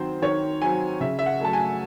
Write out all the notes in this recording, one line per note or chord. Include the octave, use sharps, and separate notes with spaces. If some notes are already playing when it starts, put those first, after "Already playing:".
Already playing: D#3 F#3 C4 C5
D#3 C#5
F#3 C4 G#5
C#3 E5
E5
F#5
F#3 A3 A5
G#5